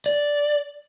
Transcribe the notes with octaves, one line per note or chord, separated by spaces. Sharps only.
D5